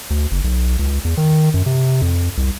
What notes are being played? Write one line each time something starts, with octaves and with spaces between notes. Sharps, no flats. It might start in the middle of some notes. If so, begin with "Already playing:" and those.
D2
F#1
B1
C#2
E2
D#3
F#2
C3
F2
C2